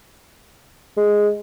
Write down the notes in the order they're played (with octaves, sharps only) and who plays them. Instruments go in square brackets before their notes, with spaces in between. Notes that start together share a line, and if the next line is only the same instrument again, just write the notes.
[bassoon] G#3